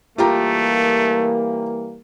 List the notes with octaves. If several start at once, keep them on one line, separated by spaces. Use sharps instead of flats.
E3 G3 A3 A#3 F4 G4 A#5